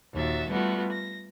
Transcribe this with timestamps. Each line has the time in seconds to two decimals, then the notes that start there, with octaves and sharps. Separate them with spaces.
0.13 D#2 A#2 F#4 E5 A6
0.48 G3 A3 B3 F4 F#4
0.92 A#6